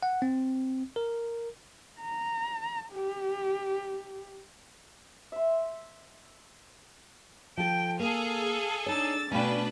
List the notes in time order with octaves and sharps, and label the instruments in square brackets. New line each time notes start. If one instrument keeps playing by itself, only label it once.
[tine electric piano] F#5
C4
A#4
[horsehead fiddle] A#5
G4
[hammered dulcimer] E5 C6
[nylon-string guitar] F3 A4 [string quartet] G5
[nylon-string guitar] A#3 [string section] G#4 A4 [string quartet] F5
[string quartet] D4 E6 A6 [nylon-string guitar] D#4 C#5
[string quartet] B2 A3 [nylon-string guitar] C#4 F5 G5 [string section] D4 B4